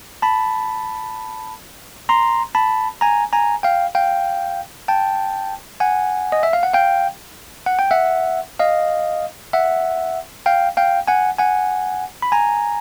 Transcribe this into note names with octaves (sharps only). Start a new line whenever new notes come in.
A5 B5
A#5 C6
A5 B5
G#5 A#5
G#5 A#5
F5 G5
F5 G5
G5 A5
F#5 G#5
D#5
E5
F5
F#5
F5 G5
F#5
G5
E5 F#5
D#5 F5
E5 F#5
F5 G5
F5 G5
F#5 G#5
F#5 G#5
B5
G#5 A#5